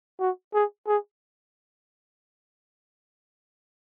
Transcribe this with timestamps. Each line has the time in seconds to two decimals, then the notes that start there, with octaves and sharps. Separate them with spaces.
0.20 F#4
0.54 G#4
0.87 G#4